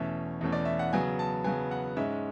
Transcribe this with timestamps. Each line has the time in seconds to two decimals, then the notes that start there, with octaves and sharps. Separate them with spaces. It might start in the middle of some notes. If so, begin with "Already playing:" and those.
Already playing: E2 B2 A3 C#4 E5
0.41 E2 B2 A3 C#4
0.52 D5
0.65 E5
0.79 F#5
0.93 C#3 F#3 B3 G#5
1.19 A5
1.44 C#3 F#3 B3 G#5
1.71 F#5
1.96 G#2 G#3 C#4 E5